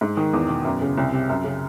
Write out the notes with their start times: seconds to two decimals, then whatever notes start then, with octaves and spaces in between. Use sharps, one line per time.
0.01 G#2
0.17 D#3
0.33 E2
0.49 B2
0.65 F#2
0.81 C#3
0.97 C2
1.12 C3
1.29 F#2
1.44 C#3